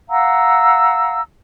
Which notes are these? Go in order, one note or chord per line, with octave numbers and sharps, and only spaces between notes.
F5 F#5 A#5 E6